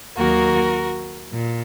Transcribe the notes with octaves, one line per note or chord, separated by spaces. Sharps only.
D#2 D#3 F#3 A#3 F#4 A#4
A#2